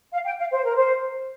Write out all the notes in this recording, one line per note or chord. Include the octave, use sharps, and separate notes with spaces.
F5
G5
F5
C5
A#4
C5